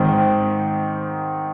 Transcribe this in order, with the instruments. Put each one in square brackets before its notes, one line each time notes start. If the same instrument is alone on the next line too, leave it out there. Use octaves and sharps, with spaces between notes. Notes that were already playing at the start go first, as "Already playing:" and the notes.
Already playing: [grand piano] G#2 D#3 C4